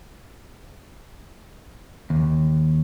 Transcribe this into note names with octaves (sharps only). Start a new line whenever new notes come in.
D#2